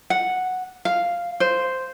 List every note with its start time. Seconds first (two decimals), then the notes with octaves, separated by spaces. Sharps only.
0.10 F#5
0.85 F5
1.40 C5